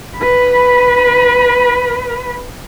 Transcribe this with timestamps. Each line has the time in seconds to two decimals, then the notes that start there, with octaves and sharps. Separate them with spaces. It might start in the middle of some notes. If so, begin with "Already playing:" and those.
0.18 B4 B5